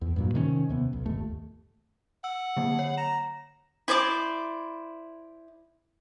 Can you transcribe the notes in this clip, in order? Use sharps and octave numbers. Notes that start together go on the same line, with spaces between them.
E2
G2 A#2 F#3
C3 D#3 G3 C#4
D#2 C3 B3
B1
G1 D#2 A3
F#5 E6
D3 F#3 A#3
C#5
A#5 E7
E4 C5 D5 D6